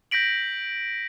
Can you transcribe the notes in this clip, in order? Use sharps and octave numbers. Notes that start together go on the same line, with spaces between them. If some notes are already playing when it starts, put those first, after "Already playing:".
G6 A#6 B6 D7 F#7